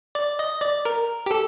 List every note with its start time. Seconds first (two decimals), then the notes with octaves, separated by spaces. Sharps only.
0.15 D5
0.39 D#5
0.61 D5
0.85 A#4
1.26 G4
1.31 A4